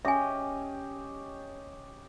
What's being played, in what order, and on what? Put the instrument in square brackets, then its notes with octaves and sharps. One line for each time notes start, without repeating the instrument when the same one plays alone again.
[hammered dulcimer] C#4 G4 D#5 [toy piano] E5 G#5